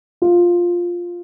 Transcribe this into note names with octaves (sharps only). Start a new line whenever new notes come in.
F4